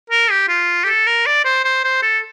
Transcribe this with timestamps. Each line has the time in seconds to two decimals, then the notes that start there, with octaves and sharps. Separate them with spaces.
0.10 A#4
0.30 G4
0.49 F4
0.84 G4
0.87 A4
1.07 A#4
1.27 D5
1.45 C5
1.65 C5
1.84 C5
2.02 A4